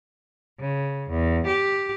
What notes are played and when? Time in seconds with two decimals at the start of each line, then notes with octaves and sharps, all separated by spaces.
0.59 C#3
1.09 E2
1.46 G4